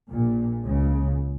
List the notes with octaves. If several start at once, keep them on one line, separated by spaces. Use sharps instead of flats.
A#1 A#2
C#2 C#3